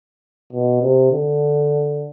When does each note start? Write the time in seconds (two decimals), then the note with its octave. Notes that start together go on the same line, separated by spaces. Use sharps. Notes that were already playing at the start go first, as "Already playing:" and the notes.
0.53 B2
0.82 C3
1.12 D3